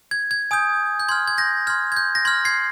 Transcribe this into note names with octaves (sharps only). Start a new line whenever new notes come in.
G#6
G#6
G#5 D#6 G6
G6
C6 F6 G#6
G#6
G6 A#6
C6 F6 G#6
G#6
G6
A#6
C6 F6 G#6
G#6 C7